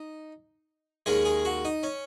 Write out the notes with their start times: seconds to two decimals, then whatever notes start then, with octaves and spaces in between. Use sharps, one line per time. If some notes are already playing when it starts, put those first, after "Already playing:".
Already playing: D#4
1.06 D#2 D#3 G#3 C#4 G#4
1.25 G#4
1.45 F#4
1.65 D#4
1.83 C#4